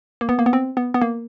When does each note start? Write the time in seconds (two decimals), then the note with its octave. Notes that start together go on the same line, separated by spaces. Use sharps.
0.21 A#3
0.29 B3
0.39 A#3
0.46 B3
0.53 C4
0.77 B3
0.94 B3
1.02 A#3